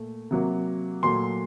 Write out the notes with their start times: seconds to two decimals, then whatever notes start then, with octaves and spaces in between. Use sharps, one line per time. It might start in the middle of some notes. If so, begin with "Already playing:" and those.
Already playing: A#2 A3
0.31 C3 F#3 A#3
1.03 A#2 F#3 A3 C6